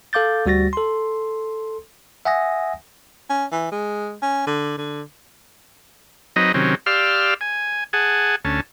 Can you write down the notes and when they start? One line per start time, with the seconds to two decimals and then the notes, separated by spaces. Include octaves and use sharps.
0.13 A4 F5 D6 G6 A6
0.46 D2 G3 F#4 A6 A#6
0.73 A4 C6
2.25 E5 F#5 G#5 D#6 A#6
3.30 C#4
3.52 E3
3.71 G#3
4.22 C#4
4.46 D3
4.77 D3
6.36 F#3 C4 D#4 B4 D#5
6.54 C3 D#3 F#3 C4 C#4
6.86 G4 D5 F5 C6 E6 F6
7.41 G#5
7.93 G#4 F#5 G#5 A5
8.45 D2 C#4 A5